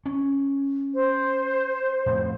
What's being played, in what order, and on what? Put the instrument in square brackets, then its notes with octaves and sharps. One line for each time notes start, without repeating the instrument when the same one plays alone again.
[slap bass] C#4
[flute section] C5
[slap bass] F2 A2